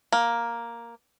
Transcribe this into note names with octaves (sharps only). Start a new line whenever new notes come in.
A#3